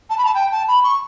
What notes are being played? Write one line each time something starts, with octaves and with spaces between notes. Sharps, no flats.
A5
B5
A5
G5
A5
B5
C#6